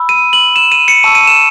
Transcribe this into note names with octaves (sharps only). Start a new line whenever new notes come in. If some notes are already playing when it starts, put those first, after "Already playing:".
Already playing: B5 E6
D#7
F#7
E7
D#7
C#7
A5 C#6 E6 D#7
D#7
E7